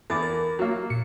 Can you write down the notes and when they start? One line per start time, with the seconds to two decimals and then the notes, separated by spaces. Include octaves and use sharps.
0.10 E2 A4 D6 A6
0.22 A#4
0.59 F#3 A#3
0.90 A#2 C#7